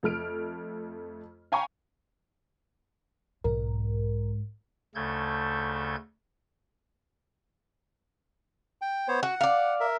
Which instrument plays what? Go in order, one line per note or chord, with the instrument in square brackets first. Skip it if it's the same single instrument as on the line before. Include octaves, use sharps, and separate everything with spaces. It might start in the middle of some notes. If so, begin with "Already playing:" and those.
[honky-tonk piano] F2 A3 F6 D7
F5 G5 G#5 A#5 B5 C#6
[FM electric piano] B1 A#4 [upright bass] G#2
[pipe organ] D2 C#3 A3 A4 G6 G#6
[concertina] G5
B3 C5 C#5
[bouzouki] F#4 [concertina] F#5
[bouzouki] D5 F5
[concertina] A#4 E5